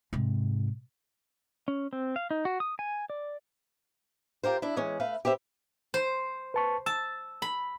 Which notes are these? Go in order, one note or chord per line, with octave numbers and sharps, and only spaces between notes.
G#2 C3
C#4
C4
F5
D#4
F#4
D#6
G#5
D5
F4 G4 A#4 C5
D4 E4
E3 G#3 C#4
A3 B4 E5 F5
G4 B4 C5 E5
C5
B4 A5 C#6
A5 E6
B5